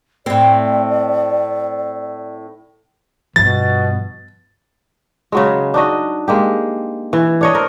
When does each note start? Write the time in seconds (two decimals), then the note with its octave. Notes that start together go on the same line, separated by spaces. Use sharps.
0.26 A2 C4 D5
3.36 G2 B2 F3 A6
5.32 C#3 F#3 G#3
5.74 D4 D#4 F#4 D#5
6.28 G#3 A#3 G4
7.13 E3
7.41 D4 C#5 D#5
7.55 A#4 C5